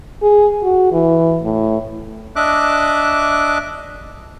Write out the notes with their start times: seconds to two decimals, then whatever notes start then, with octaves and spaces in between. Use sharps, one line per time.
0.22 G#4
0.63 F#4
0.92 E3
1.43 A2
2.36 D4 D#5 E5 D6 F#6